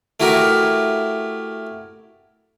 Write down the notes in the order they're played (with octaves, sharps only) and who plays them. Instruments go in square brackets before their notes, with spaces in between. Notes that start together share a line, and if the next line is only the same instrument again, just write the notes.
[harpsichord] A3 E4 F#4 G4 A#4